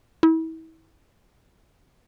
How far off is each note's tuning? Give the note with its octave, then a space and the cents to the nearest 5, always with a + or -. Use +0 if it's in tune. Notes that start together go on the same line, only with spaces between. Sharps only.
E4 -35